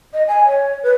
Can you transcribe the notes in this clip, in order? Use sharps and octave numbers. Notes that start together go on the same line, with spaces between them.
D#5
G#5
C#5
B4